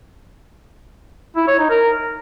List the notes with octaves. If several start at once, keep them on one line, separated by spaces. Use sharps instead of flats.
E4
C#5
D#4
A#4